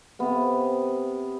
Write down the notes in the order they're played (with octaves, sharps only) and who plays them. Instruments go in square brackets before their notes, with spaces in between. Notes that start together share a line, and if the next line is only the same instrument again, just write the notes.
[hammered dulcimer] C3 B3